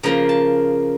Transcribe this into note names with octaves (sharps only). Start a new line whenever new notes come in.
C#3 F3 A#3 A#5
A5